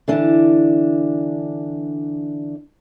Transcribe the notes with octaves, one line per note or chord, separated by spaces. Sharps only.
D3 E3 D4